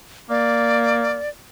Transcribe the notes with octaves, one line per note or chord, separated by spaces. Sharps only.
A#3 D5